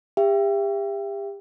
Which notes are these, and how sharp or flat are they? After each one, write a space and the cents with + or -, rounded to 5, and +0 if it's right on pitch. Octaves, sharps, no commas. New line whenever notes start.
G4 +35 E5 +35 G5 +0